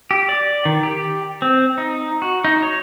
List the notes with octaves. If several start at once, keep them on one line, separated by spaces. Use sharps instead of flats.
G4
D5
D#3
G4
C4
D#4
F#4
D#4
C#5